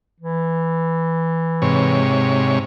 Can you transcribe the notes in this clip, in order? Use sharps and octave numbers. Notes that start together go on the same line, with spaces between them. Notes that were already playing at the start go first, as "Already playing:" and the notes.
E3
G#2 C3 C#5